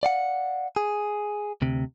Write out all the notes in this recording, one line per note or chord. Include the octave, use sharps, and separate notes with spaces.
D5 F5 F#5
G#4
D2 C3